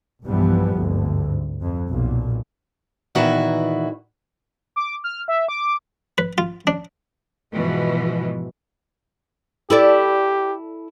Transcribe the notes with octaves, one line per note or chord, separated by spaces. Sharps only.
B1 G2 E3 F3 G3 B3
G#1 D2 G2
F2
B1 A#2
A#2 D#3 E3 B3 E4 F#4
D6
F6
E5
D6
B4
F4
D4
G#2 B2 E3 F3
E4 G4 A4 D5